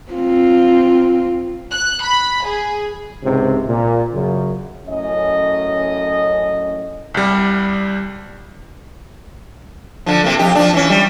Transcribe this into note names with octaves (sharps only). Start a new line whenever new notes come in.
C4 F4
F#6
B5
G#4
C#2 G#2 C3
A#2
F#2 C#3
F#2 A2 C#4 D#5
C2 G3
D3 F3
C3 A#3
F2 G4
F3 D4
E3 C#4
G3